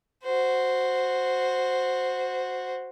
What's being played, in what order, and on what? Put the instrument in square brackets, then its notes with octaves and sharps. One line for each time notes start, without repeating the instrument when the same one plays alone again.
[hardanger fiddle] F#4 C5